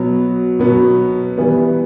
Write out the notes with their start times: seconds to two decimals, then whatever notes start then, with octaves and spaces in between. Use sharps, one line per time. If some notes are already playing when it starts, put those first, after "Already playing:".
Already playing: B2 F#3 B3
0.59 B2 F#3 B3
1.37 E3 G3 B3